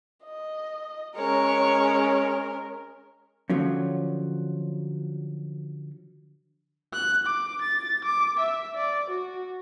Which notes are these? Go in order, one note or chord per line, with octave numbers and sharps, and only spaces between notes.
D#5
G#3 C#4 A#4 C#5
D3 F3 F#3 C#4
F#6
D6
A6
D6
E5
D5
F#4